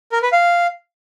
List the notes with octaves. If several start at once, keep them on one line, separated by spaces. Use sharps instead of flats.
A#4
B4
F5